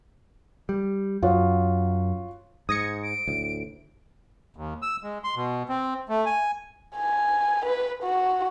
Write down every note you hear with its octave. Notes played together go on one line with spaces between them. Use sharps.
G3
F#2 F4 F#4 C#5
G#2 D#6 G#6 A#6 C#7
D7
D2 A2
D#2
E6
G#3
C6
B2
C4
A3
G#5
G#5
B4
F#4